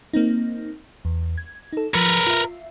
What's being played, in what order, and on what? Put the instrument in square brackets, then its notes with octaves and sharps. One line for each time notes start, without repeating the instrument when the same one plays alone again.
[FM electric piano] A#3 C4 D#4
E2
G#6
D#4 A4
[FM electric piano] F3 A6 C#7 [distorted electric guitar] A#4 B4
[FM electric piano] F4 E5